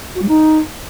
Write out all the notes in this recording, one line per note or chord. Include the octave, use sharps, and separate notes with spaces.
F#4
G3
D#4